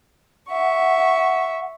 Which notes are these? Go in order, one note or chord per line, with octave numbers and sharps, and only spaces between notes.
E5 F#5 C#6